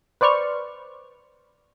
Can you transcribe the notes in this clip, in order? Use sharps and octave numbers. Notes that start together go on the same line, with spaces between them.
B4 C5 D5 C#6 F6